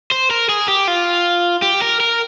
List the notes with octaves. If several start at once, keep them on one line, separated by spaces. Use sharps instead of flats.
C5
A#4
G#4
G4
F4
G4
A#4
A#4